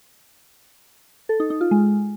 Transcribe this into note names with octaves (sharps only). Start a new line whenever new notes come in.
A4
D#4
D#4
F4
G#3